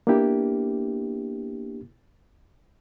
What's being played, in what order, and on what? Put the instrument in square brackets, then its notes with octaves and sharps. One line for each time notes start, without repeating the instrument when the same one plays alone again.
[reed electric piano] A#3 B3 D4 E4 G4